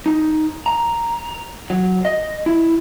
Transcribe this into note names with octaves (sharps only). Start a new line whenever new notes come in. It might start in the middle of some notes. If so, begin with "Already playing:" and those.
D#4
A#5
F#3
D#5
E4